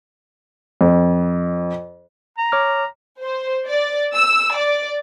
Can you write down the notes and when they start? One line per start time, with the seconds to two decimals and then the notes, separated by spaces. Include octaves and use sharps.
0.81 F2
2.38 A#5
2.52 C#5 D6 F6
3.21 C5
3.67 D5
4.14 E6
4.56 D5